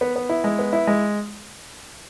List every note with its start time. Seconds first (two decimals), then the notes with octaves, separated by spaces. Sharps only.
0.01 B3
0.16 B3
0.29 E4
0.44 G#3
0.59 B3
0.73 E4
0.87 G#3